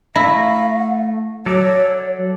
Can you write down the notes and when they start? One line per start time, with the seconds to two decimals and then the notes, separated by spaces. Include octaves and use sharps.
0.16 A3 E4 F5 A#5
1.46 F#3 A4 C#5 D5 E5